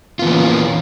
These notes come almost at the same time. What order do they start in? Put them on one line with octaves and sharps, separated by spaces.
F4 B3 E3 A#3 C#4